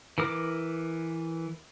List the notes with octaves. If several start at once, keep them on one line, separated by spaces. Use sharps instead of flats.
E3 A#4 D6